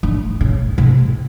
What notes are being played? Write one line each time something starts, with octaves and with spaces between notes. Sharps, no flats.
D3
C#3
C3